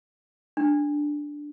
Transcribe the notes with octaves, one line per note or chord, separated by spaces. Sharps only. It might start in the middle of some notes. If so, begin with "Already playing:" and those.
D4